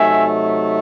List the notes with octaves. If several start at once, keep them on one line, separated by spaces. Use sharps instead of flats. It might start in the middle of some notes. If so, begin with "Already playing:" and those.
Already playing: C3 F#3 A3 D#4 E5 G#5